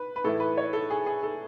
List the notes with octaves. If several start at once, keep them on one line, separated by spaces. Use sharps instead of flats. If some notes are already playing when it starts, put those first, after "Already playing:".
Already playing: B4
B4
A2 E3 A3 E4 A4
B4
C#5
A4
G#4
G#4
A4